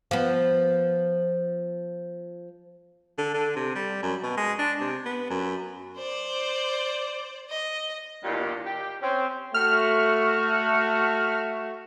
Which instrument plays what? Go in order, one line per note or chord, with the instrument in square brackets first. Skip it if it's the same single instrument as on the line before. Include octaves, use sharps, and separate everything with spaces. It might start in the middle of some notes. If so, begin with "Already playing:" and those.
[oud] F3 B3
[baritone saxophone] D3
D3
C3
G3
F#2
B2
G#3
D4
C3
B3
F#2
[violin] C5 D5
D#5
[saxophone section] E2 G2 A#2 D#3 A#3 G4
G4
C4 C#4
[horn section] A3 F#4 [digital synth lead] F6